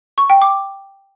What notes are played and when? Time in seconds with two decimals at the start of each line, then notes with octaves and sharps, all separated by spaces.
0.18 C#6
0.30 G5
0.42 D6